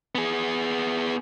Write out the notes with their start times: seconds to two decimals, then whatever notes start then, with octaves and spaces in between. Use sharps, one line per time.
0.15 B3 G#4